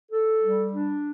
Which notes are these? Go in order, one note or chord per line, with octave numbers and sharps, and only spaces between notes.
A4
G3
D4